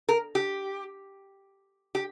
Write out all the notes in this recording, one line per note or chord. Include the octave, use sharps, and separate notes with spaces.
A#4
G4
G4